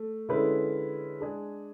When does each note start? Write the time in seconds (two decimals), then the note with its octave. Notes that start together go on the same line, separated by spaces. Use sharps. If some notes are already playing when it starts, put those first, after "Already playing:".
Already playing: A3
0.29 D3 G#3 C#4 E4 B4
1.20 G#3 D4 G#4